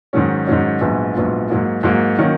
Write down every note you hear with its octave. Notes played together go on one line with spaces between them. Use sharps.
G#2 D#3 F#3 C#4
G#2 D#3 F#3 C#4
A#1 G#2 F#3 B3 F4
A#1 G#2 F#3 B3 F4
G#2 F#3 A#3
G#2 F#3 A#3
D#3 F#3 A#3 C#4